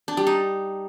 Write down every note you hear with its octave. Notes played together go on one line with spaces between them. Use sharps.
D4
G3
D#4